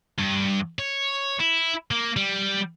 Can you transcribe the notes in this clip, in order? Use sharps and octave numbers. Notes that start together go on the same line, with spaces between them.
G2
C#5
E4
A#3
G3